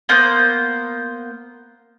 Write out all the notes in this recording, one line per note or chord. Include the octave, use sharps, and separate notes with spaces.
A#3 B3 C5